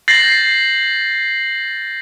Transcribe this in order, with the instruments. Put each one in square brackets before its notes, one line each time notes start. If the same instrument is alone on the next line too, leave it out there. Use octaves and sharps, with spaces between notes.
[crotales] G6 A6 A#6 C7 F#7